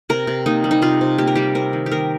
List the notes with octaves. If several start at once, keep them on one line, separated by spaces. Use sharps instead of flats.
C3 A#4
C3
A#3 D#4
G3
D#4
C3 F4
C3
A#3 G4
A#4
G3 G4
C4 A#4
D#3
G4
D#3 A#4